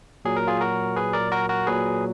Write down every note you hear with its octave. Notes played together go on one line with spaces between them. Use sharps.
A#2 F#3 G#4
A#4
F4 G#4
F#4 A#4
G#4 B4
A#4 D5
F#4 A#4
F#4 A#4
A#2 F#3 G#4 B4